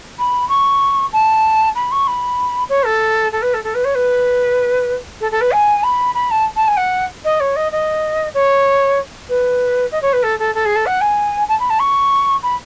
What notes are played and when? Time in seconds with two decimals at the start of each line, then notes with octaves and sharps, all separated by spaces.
0.19 B5
0.49 C#6
1.13 A5
1.75 B5
1.92 C#6
2.07 B5
2.69 C#5
2.85 A4
3.32 A4
3.42 B4
3.54 A4
3.64 A4
3.75 B4
3.85 C#5
3.95 B4
5.21 A4
5.31 A4
5.41 B4
5.52 G#5
5.83 B5
6.15 B5
6.31 A5
6.56 A5
6.68 G#5
6.77 F#5
7.25 D#5
7.40 C#5
7.56 D#5
7.72 D#5
8.34 C#5
9.29 B4
9.92 D#5
10.02 C#5
10.13 B4
10.23 A4
10.39 A4
10.55 A4
10.65 G#4
10.76 A4
10.86 F#5
11.01 G#5
11.49 A5
11.60 B5
11.70 A5
11.80 C#6
12.43 B5